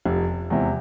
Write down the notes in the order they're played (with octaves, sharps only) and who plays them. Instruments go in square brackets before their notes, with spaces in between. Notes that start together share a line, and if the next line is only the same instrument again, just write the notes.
[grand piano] F1 [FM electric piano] F3
[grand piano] E2 C3 [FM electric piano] G#3